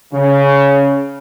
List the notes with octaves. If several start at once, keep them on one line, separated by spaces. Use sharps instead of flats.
C#3